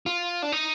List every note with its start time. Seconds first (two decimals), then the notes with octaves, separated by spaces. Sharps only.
0.06 F4
0.42 D4
0.52 D#4